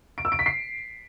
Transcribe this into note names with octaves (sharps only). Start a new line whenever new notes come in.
D7
E6
D7
B6
C7